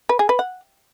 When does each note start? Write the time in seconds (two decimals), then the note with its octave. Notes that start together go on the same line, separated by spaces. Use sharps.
0.09 B4
0.19 G#4
0.29 B4
0.39 F#5